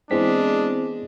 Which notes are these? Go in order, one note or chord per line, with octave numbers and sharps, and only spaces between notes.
E3 G#3 B3 C4 D4 G#4 B6